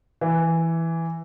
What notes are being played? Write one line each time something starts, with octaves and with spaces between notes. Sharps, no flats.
E3